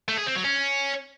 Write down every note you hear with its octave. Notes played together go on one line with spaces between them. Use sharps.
A3
G#4
C4
F#3
C#4